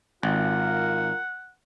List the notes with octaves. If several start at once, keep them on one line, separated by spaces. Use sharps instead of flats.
G#1 F4 A#4 F#5